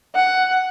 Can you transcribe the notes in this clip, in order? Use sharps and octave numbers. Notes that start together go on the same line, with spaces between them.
F#5